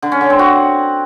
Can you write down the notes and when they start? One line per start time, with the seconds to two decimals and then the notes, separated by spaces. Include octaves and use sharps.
0.02 D3
0.12 C#4
0.21 D3
0.30 C4
0.39 F#4